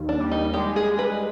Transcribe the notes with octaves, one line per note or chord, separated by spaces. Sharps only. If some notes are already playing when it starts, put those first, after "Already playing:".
Already playing: D#2
D4
G3
D#4
G#3 G4
G#4
G#3
B4